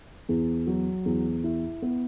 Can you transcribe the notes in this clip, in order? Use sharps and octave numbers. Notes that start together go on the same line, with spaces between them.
E2
F#3
E2
E4
B3